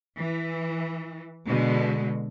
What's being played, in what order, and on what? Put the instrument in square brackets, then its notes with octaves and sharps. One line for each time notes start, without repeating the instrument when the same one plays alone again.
[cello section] E3
B2 D3 G#3